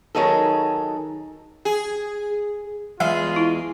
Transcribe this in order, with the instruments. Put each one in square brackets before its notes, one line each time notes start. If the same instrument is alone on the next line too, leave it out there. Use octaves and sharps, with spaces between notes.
[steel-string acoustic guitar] D#3 F3 F#3 D#4 G#4 A4
[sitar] G#4
[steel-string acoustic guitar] E2 G#3 G#4 [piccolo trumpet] F4 [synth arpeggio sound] E5 F5
[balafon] E4